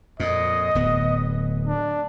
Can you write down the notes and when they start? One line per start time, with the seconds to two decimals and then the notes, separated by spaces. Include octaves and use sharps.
0.20 F2 A#2 D#5
0.75 D1 B3
1.67 D4